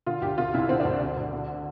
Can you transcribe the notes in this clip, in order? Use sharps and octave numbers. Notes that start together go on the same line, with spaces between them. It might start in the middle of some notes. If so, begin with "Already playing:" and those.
D3 F4
D2 G4
C3 F4
C2 E4
D3 C4
D2 D4
D3
D2
D3